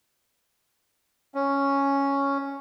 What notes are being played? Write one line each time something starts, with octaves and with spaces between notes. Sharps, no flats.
C#4